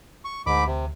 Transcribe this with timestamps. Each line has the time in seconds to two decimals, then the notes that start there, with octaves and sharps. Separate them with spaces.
0.25 C#6
0.46 D2 G#2 B5 D6
0.67 C3